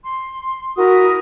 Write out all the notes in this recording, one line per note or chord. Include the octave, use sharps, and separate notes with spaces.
C6
E4 F#4 A#4 D#6